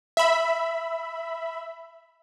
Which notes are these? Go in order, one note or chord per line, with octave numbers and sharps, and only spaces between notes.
E5 B5